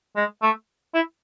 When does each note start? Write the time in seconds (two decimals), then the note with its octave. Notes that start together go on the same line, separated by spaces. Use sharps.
0.16 G#3
0.42 A3
0.94 E4